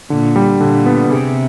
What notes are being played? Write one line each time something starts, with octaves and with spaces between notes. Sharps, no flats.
A#2 D3
G3
A#2 D3
B3
C3 G#4